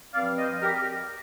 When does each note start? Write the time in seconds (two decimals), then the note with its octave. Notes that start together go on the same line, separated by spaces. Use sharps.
0.15 G2 F3 C4 D5 F5
0.38 C5 D#5
0.62 G4 A#4